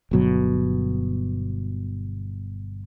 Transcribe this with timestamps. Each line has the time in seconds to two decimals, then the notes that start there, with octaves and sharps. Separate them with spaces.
0.11 G1 B2 F#3